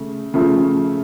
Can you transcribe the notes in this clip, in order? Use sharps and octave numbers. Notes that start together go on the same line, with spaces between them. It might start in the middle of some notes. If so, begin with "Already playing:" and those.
Already playing: C#3 A3
C#3 F3 A3